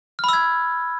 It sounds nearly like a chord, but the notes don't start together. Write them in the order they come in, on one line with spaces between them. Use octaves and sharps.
F6 B5 E6 G#6